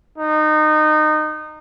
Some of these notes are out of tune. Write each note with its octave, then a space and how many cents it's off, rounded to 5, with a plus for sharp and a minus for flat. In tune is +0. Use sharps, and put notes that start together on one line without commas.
D#4 -25